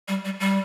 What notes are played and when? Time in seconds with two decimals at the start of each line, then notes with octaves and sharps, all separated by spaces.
0.08 G3
0.25 G3
0.40 G3